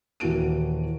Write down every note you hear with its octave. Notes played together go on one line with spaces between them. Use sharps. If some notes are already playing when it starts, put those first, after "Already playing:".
D#1 E3 A#3 F#4 D7 D#7